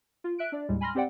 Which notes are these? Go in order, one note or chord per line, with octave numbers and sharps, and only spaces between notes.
F4
E5 F#6 D7
D4 D5
D#2 A2 G3 G#3
G#5 B5 C6 F6 A#6
C4 G4 C5 D5 F#5 G5